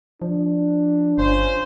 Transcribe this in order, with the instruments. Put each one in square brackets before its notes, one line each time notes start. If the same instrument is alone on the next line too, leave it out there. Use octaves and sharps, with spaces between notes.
[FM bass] F3 [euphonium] D4
[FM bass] G1 [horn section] C#4 F4 C5